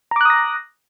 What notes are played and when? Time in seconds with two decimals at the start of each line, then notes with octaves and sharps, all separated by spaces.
0.11 A#5
0.16 D6
0.21 F#6
0.25 D#6
0.30 A#6